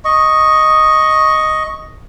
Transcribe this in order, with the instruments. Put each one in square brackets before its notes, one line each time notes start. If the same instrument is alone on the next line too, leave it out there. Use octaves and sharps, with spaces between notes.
[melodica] D#5 C#6